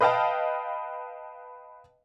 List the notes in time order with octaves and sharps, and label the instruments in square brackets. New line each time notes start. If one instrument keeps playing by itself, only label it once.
[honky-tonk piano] B4 D#5 F5 G5 A5